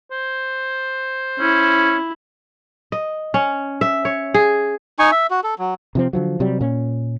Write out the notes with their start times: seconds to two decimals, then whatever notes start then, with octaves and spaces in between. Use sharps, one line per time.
0.11 C5
1.40 C#4 E4
2.92 D#5
3.34 C#4
3.81 E5
4.05 C#5
4.34 G#4
4.99 D#4 G#5 C#6
5.11 E5
5.31 F#4
5.44 A4
5.59 F#3
5.95 C3 F3 C4
6.13 D3 F3 F#3
6.40 C3 F#3 G3
6.61 A#2 C#4